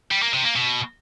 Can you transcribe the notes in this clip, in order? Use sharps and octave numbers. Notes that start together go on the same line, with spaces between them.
G3
A#3
C3
A#3
B2